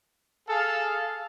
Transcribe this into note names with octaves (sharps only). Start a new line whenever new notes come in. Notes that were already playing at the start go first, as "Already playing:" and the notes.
G#4 A4 F5